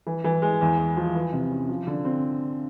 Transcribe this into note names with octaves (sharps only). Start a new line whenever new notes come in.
E3
E3
G#3
E2
E2
F3
E3
C3
C#4
F3
D3
C4